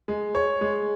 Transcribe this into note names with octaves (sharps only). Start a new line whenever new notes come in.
G#3
C#5
G#3